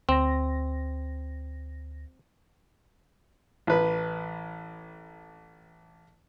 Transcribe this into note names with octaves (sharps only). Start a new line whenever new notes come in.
D2 C4 A#6
A1 B4